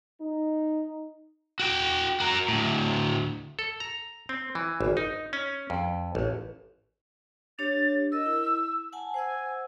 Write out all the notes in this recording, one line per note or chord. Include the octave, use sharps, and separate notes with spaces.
D#4
F#4 G5
F#4 A#4
D2 A2
A4
A#5
C4
E3
G#1
D#4
C#4
F2
A1
D4 G4 C#5 A6
A#4 D#5 E6
E4
F#5 G#5 A5
C5 F#5 G#5 E6